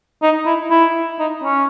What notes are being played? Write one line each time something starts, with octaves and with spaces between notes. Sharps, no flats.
D#4
E4
E4
D#4
C#4